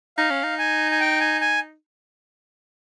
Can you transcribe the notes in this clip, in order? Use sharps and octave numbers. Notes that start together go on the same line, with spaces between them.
D#4 F5
C#4
D#4
G#5
G#5
G5
G#5
G#5